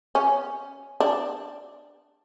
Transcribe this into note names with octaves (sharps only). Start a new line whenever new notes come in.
C#4
D4